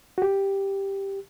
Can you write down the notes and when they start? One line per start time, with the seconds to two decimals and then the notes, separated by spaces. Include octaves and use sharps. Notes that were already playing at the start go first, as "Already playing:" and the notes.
0.18 F#4
0.22 G4